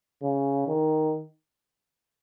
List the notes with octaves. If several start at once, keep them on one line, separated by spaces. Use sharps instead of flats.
C#3
D#3